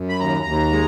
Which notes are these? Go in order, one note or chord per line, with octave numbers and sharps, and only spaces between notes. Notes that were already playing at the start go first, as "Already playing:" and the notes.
Already playing: F#2
B5
D#2 A#5
D#2
G#3